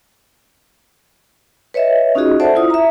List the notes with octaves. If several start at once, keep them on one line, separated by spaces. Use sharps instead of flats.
B4 C#5 D#5 E5
C#4 D#4 F4 F#4 G#4 D#5
A4 C5 D5 E5 F#5 A5
E4 F4 D#6
E5 A#5